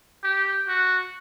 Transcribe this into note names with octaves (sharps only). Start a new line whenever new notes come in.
G4
F#4